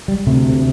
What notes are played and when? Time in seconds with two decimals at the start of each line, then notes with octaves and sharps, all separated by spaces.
0.08 G3
0.27 D2 C3 A3